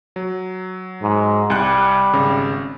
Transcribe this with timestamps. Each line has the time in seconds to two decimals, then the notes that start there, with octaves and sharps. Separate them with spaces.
0.16 F#3
1.02 G#2
1.50 C2 G3 F#6
2.13 G#1 C#3